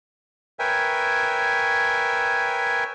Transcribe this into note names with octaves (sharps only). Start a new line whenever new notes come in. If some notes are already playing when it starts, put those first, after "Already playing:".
A#4 B4 C#5 E5 G5 G#5